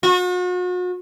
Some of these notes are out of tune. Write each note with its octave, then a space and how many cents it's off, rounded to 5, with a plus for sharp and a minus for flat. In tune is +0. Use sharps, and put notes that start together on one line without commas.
F#4 -40